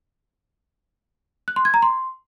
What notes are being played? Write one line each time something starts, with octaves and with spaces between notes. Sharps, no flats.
F#6
C6
G#6
A#5
C6